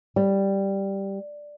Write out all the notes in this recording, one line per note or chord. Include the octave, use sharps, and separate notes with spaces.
G3